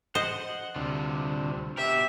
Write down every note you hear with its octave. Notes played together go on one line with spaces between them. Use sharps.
C5 D#5 F#5
D2 C3 G3 F4
B2 G4 A#4 E5